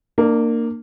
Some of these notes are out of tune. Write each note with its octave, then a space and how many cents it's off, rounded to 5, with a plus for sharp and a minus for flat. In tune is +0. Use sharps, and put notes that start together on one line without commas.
A#3 -10 D4 +35